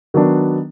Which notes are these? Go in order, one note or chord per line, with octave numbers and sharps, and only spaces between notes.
D#3 F#3 B3 D4